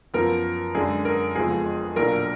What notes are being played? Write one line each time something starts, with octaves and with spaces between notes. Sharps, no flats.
F#2 F3 B3 A#4
F#2 D3 G#3 D4 G#4
A#4
F#1 F2 F3 G#3 B3 G#4
B1 A#2 F#3 D4 A#4